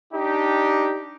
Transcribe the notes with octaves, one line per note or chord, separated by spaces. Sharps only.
D4 D#4 G4